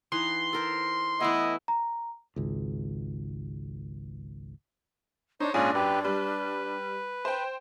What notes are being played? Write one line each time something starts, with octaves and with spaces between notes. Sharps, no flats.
E3 D#4 F#5 C6
A4 A#4 C5
E3 A3 B3 E4 D#5
A#5
G#1 C#2
D4 D#4 C5 C#5
A#1 G#2 C#4 D4 F4 G#4 D#7
F#2 G4 B4
G3 B4
C5 G5